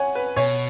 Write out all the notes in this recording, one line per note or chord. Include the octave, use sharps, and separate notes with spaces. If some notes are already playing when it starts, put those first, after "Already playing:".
Already playing: C#5 F#5 G#5
B4
B2 C#5